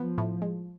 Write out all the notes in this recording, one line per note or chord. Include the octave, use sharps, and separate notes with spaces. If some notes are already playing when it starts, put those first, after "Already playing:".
Already playing: F3 B3
A2
G#3